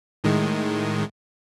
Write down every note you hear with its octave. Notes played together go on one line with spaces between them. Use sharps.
A2 D#3 G#3